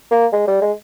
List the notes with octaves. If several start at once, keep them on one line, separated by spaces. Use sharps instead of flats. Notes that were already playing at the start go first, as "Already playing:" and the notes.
A#3
G#3
G3
G#3